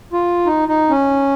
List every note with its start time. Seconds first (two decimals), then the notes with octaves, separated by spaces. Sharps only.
0.13 F4
0.46 D#4
0.69 D#4
0.90 C#4